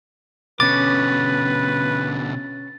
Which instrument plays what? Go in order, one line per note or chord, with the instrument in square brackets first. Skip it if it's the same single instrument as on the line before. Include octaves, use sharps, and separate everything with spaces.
[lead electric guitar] B2 D3 [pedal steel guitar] C#4 D6 [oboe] B4 [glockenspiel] A6